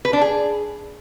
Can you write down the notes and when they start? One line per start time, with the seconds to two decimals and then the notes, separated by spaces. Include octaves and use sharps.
0.05 B4
0.13 D4
0.21 G#4